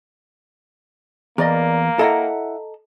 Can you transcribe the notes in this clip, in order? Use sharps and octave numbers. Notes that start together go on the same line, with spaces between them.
E2 A#3 A#4 D5 D#5
E4 A4 D#5 F#5 A#5